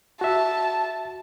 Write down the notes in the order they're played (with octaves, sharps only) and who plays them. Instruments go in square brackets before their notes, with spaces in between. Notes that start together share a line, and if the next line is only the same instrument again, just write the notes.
[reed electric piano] F#4 E5 [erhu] A5